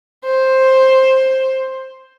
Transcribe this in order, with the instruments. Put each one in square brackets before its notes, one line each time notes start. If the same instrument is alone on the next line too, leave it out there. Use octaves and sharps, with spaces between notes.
[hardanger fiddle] C5